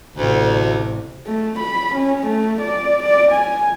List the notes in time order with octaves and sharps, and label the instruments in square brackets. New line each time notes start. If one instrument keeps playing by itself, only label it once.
[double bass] A1 C3 [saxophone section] D2
[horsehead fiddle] A3
B5
C#4
A3
D5
D5
G#5